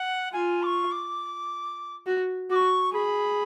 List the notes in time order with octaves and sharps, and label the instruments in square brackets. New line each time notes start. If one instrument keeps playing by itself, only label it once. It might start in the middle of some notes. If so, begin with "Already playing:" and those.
Already playing: [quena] F#5
[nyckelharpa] F4 [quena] G#5
[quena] D6
C#6
D6
[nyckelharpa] F#4
[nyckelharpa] F#4 [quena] C#6 D6
[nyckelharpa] G#4 [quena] B5